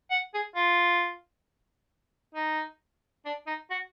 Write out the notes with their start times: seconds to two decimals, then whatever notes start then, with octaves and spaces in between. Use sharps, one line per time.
0.11 F#5
0.34 G#4
0.56 F4
2.35 D#4
3.25 D4
3.47 D#4
3.70 F#4